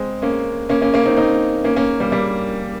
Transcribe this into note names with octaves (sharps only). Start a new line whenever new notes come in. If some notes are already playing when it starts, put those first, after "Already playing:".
Already playing: G#3 C4
A#3 C#4
A#3 C#4
A#3 C#4
A#3 C#4
C4 D#4
C4 D#4
A#3 C#4
A#3 C#4
G3 A#3
G3 A#3